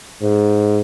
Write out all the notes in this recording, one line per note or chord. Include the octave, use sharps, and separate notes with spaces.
G#2